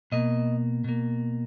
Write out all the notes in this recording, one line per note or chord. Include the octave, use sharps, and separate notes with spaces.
B2 A#3 D#5
B2 A#3